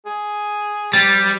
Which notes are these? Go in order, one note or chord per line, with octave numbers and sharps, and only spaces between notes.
G#4
G3 C4 A6